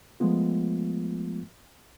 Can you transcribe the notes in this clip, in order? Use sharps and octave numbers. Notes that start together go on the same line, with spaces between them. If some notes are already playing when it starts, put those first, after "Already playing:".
F3 G#3 A3 B3 F4